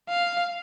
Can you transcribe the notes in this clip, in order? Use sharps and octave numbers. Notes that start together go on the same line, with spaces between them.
F5